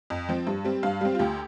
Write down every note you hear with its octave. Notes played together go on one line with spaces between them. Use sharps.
F2
F3 C4
G2
G3 C4
G2 F5
G3 C4
F4
D2 G4